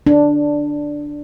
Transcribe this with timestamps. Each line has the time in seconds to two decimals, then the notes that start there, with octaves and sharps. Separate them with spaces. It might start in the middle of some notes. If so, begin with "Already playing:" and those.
0.07 D4